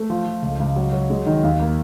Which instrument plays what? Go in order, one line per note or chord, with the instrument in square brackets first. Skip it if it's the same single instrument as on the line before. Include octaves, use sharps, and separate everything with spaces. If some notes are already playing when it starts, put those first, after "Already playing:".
Already playing: [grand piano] A3
F3
F3
C#2
C#2
F#3
F#3
G#3
D#3
D#2
A#3